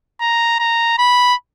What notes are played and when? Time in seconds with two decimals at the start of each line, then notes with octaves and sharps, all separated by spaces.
0.21 A#5
0.59 A#5
0.99 B5